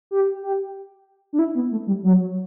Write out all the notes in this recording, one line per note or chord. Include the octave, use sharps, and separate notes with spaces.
G4
G4
D4
E4
B3
A3
G3
F#3